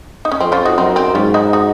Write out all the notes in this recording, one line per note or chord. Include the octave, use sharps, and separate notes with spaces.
D#4
C#4
F2 C4
C#4 F4
D#4 F#4
F#2 C4 D#4
C4 D#4
G#2 C#4 F4
D#4 F#4
D#4 F#4